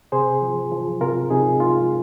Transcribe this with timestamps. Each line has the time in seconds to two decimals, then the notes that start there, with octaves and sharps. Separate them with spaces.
0.12 C3 G#4 C5
0.42 F3
0.71 F3
1.01 C3 F4 A#4
1.30 C3 D#4 G#4
1.60 G#3 F4